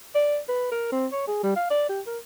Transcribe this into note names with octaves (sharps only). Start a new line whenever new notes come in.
D5
B4
A#4
C4
C#5
G#4
G3
F5
D5
G4
A#4